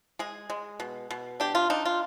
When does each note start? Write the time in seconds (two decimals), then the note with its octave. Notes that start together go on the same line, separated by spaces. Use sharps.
0.19 G#3 G#4
0.50 G#3
0.80 B2
1.11 B2
1.40 D4 G4
1.55 F4
1.70 D4 D#4
1.85 F4